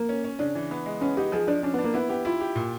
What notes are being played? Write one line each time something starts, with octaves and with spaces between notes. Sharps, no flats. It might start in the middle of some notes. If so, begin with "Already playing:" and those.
Already playing: A#3
C#4
C#4
C#3 D4
E3
B3
G#3
B3 C#4
D#4 G4
F3 G#4
F3 D4
C#4 D4
B3
D4
A#3
B3 E4
B3 G4
E4 F4
G4
A#2